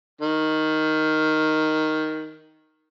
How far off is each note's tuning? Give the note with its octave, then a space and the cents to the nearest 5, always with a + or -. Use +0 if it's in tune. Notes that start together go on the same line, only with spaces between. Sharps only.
D#3 +5